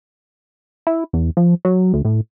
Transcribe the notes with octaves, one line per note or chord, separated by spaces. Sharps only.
E4
E2
F3
F#3
D2
A2